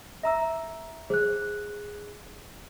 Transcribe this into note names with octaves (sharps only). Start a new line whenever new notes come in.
E5 A#5 E6
G#4 C5 F#6